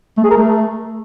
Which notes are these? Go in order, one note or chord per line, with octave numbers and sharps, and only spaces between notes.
A3
G#4
A#4
A3